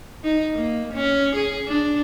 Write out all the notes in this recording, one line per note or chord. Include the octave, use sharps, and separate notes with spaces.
D#4
A#3
C#4
G#4
D4